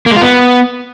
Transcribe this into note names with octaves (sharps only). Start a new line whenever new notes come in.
A#3
G#3
F4
B3